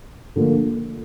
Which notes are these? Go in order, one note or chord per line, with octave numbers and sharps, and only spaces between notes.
D3 F3 A#3